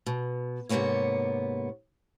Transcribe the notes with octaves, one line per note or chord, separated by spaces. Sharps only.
B2
G#2 C3 F#3 A#3 B3 C#5